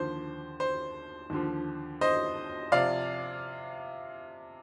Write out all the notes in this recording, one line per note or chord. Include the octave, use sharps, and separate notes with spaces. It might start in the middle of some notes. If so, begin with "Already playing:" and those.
Already playing: D#2 D3 F3 C5
C5
D#2 D3 F3
C5 D#5
C3 F3 D5 F5